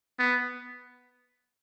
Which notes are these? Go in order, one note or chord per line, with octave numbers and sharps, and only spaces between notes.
B3